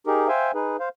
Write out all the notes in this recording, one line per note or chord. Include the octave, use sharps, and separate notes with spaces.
D#4 G4 G#4 A#4
C5 E5 F5 G5 G#5
D#4 G#4 B4
C5 F5